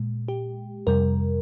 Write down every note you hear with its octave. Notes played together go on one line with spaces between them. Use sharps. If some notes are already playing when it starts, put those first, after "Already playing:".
Already playing: A#2 G#3
G4
F2 C3 G3 A#4